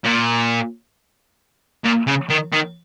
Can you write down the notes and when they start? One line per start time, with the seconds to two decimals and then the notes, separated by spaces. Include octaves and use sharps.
0.04 A#2
1.85 A#2
2.07 C#3
2.30 D#3
2.53 D#3